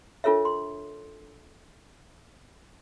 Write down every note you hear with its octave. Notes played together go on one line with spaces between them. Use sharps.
D4 F4 A4 A#4 C#5 E5
C6